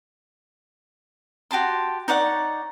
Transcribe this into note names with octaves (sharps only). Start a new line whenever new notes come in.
F#4 G4 A5 C6
D#4 C#5 D5 F#5